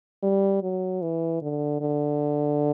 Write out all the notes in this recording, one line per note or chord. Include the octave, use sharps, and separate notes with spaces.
G3
F#3
E3
D3
D3